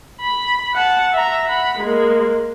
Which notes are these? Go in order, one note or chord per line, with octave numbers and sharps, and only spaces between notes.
B5
F#5 A5
E5 A#5
F#5 B5
G#3 A#3